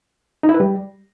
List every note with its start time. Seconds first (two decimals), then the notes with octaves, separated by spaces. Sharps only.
0.43 D#4
0.49 E4
0.54 B4
0.60 G3